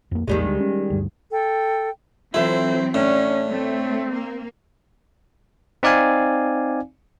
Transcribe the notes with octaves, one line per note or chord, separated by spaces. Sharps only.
F2 A#3
A#1 E2 D#3 G3 G#3 A#3
D2 D4
C#4
D2 G2
A4 G5
E3 F#3 C4 E4 F4 A4 C5 E5
A2 C#4 D4
A3 C4
A#3
C4 D#4 D5 F5 G#5